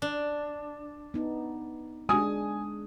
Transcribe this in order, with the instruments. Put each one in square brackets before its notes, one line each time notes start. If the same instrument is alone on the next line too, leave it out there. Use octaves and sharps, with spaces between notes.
[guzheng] D4
[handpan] B3 D#4
[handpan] G#3 D4 [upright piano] G#5 D#6